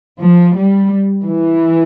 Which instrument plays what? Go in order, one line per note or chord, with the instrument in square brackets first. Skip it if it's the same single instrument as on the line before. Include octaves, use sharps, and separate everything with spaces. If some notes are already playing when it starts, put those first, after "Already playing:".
[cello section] F3
G3
E3